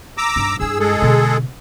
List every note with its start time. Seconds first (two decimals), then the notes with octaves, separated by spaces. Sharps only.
0.17 A#5 D6 E6
0.36 G2 D#4
0.60 G2 E4 G#4 E6
0.79 G#3 G#4 A4
1.02 B2 D3